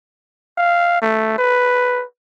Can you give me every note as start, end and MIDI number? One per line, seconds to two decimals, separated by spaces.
0.58 1.01 77
1.02 1.36 57
1.38 2.04 71